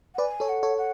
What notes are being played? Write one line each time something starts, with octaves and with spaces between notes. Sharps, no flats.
F#5
B4 D5 G#5
A4 C#5
F#5
A4 C#5
F#5